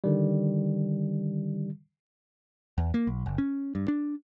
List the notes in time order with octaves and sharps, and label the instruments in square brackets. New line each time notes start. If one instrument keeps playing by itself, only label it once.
[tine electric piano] D3 D#3 G3
[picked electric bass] E2
A#3
B1
F#1
C#4
G2
D4